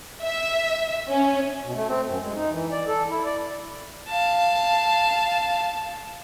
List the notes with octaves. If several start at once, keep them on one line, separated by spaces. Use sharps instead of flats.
E5
C#4
B2
A3
C4
F#2
G#3
D#4
E3
D5
A4
E4
D5
F5 A5